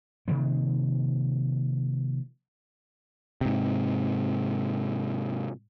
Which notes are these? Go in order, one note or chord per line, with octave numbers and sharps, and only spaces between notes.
C3 D#3 F3 A#3
G#2 C3